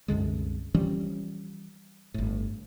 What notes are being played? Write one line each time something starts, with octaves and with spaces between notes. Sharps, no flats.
C2 F#2 D3 G#3
E3 F3 G3 C#4
G1 A2